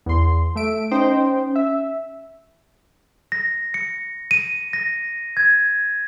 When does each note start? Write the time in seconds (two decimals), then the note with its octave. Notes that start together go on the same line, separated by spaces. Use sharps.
0.06 E2 C6
0.55 A3 E5 D7
0.91 C#4 D#4 C5 G5
1.56 E5
3.32 A#6
3.74 C#7
4.31 D#7
4.73 A#6
5.37 G#6